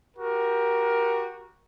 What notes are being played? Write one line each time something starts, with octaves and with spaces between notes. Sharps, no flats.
F#4 G4 A#4